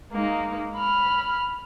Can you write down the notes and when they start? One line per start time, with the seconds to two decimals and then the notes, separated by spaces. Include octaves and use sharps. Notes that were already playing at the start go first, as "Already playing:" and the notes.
0.11 G#3 A#3 D#4
0.76 B5 F6